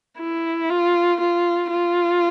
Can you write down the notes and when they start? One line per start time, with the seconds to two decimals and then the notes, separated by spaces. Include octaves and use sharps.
0.19 E4
0.70 F4
1.20 F4
1.71 F4